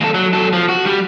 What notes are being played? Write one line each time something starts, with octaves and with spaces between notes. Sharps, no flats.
D#2 A4
F#3
F#3 A4
F3
F#4
G3